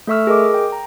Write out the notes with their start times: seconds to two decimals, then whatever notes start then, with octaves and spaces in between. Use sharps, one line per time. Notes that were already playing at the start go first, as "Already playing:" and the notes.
0.07 A3 A4 E5 C#6 E6 F6
0.27 G#4 A#4 D#5 D6
0.54 G5
0.72 A#5